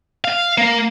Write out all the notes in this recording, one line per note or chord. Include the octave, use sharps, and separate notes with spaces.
F5
A#3